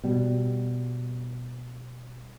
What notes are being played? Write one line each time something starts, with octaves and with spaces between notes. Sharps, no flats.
B2 G3